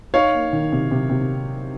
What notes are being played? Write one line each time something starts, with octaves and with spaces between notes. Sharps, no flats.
D#4 C#5 F5
A#3
D#3
C3
C3
C3